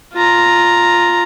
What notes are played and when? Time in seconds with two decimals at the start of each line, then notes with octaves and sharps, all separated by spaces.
0.13 F4 A#5